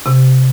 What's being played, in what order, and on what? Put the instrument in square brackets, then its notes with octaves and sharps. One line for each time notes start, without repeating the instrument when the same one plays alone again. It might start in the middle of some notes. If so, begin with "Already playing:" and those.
[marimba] C3